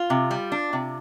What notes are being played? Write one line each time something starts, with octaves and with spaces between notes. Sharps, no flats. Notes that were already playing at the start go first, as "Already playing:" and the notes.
Already playing: F4
C3
G3
D4
C3